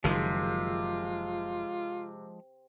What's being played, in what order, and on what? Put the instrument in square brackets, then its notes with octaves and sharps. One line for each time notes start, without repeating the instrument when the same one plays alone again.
[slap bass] F#1 D#3 [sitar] C3 [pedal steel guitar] F3 G#3 [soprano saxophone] F4